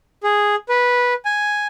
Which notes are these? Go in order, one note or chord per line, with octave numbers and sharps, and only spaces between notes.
G#4
B4
G#5